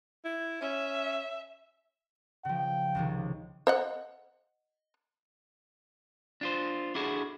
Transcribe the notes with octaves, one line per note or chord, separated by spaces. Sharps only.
E4
C#4 E5
C#3 F3 G5
C#2 C3 D#3
C5 D#5 F#5
D4 F4 C5
D4 E4 F#4 G#4 A4